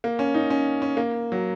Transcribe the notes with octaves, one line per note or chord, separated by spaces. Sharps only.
A#3
C#4
D#4
C#4
C#4
A#3
F#3